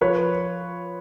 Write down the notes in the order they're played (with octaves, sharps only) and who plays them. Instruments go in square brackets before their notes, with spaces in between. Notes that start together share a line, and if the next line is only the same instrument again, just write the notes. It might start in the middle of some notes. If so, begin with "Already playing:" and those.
[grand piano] F3 B4 C#5